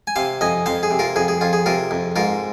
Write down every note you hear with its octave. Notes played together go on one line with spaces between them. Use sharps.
G#5
C3 C5 F5
F2 D#5 G#5
F2 C5 F5
G#4
C3
F4 A#4
F2 G#4
G#4
F2 F4
G#4
C3 F4 A#4
F2
G#2 F4 A#4